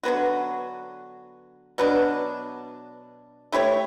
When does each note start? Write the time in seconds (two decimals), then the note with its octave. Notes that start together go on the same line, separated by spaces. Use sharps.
0.03 D3 F#3 B3 F#4
1.78 B2 F#3 B3 D4
3.52 A3 E4 G4 C#5